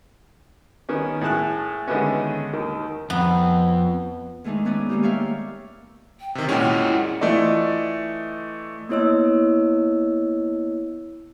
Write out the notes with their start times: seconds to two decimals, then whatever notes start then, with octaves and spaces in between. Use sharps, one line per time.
0.89 D#3 B3 C#4
1.21 A2 G#4 A5 F#6
1.87 D3 D#3 G#3 A3 B3 C#4
2.53 D#2 D#3
3.10 F2 B3
4.44 D#3 G#3 A3 D4 D#4
4.65 B3 C#4 D4 B4 D5 D#6
4.89 D#3 G3 G#3 A#3 D#4 G4
5.03 C#5 D5 E5 F5 G5
6.20 G5
6.35 C3 D#3
6.49 A#2 G#3 C#4 E4 F#4
7.21 E3 A3 F4 A4 D5 D#5
8.89 A#3 B3 E4 C#5 D#5 E6